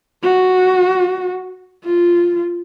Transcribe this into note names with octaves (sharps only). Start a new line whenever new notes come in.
F#4
F4